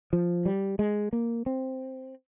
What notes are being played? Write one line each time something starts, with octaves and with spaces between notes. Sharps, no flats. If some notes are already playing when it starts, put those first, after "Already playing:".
F3
G3
G#3
A#3
C4